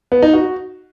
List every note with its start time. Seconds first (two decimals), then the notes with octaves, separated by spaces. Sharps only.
0.12 B3
0.22 D#4
0.33 F#4